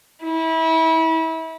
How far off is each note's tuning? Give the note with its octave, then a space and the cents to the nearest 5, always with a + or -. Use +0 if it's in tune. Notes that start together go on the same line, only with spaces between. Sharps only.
E4 -30